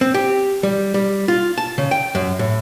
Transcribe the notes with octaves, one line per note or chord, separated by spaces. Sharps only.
C4
G4
G3
G3
F4
A5
C#3
G5
F#2
A2